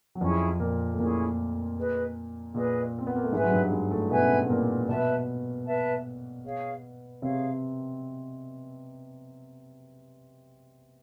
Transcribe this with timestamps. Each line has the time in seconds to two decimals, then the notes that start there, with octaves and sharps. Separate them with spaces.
0.15 F#3
0.21 F2 F3 C#4 E4 G#4
0.60 A#2 A#3
0.93 A3
0.99 A#2 A#3 C#4 E4 G#4
1.77 G#4 B4 D#5
2.55 A#2 A#3 G#4 B4 D#5
2.98 C4
3.07 B3
3.16 A#3
3.24 A3
3.32 G#2 G#3 B4 E5 G#5
3.44 F#3
3.52 G2 G3
3.72 G#2 G#3
3.91 A2 A3
4.10 B2 B3 B4 E5 G#5
4.21 C#4
4.31 C4
4.41 B3
4.50 A#2 A#3
4.89 B2 B3 B4 E5 A5
5.66 B4 E5 A5
6.44 G#4 C#5 F5
7.22 C3 C4 G#4 C#5 F5